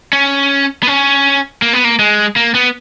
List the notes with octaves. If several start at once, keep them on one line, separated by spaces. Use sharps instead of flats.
C#4
B3
C#4
A#3
B3
A#3
G#3
A#3
B3